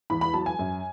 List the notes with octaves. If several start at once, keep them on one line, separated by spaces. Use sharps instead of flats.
E2 B5
B5
F#3 A5
G#5
F#2